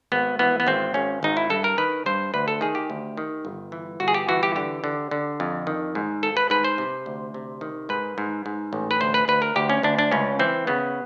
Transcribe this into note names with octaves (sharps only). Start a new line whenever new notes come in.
G#1 B3
E3 B3
B3
G#1 C4
G#1 C#4
G#1 D#4
E4
G2 A4
A#4
D#3 B4
G2 C5
D2 B4
A4
D#3 G#4
G4
D2
D#3
G1
E3
G1 F#4
G#4
G4
E3 F#4
G4
D3 G4
D3
D3
F2
D#3
G#2
G#1 A4
B4
G#2 B4
C5
C3
D2
C3
D#3
G#2 B4
G#2
G#2
A1
B4
D2 C5
B4
D2 B4
A#4
D2 G4
C#4
D2 D4
D4
C#2 C#4
E3 C4
C#3 B3